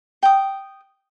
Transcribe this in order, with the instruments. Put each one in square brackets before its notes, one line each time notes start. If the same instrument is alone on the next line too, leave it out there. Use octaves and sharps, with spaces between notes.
[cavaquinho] G5 D#6